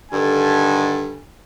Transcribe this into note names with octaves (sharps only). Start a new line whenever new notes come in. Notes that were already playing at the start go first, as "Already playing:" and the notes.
G2 D3 D#3 G3 A4 G#5